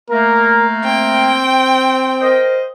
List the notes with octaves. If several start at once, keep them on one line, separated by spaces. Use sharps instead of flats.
A3 A#3 A#4
C4 G5
A#4 C5 D#5